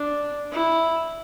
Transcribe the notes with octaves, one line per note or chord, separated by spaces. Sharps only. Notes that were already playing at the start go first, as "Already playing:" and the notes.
Already playing: D4
E4